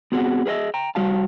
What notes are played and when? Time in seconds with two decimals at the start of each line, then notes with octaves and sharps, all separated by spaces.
0.12 B3 C4 F#4 G#4 F#5
0.46 G#4 B4 C5 D#5 E5
0.74 G5 A#5
0.95 G3 F#4 F5 A5